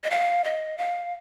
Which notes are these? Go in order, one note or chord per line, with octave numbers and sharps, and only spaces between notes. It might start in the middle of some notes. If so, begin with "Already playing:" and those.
D#5
F5
D#5
F5